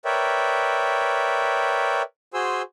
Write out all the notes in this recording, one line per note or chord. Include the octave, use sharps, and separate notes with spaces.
A#4 B4 C#5 D5 E5 G5
F#4 G#4 C5 G#5 C6 E6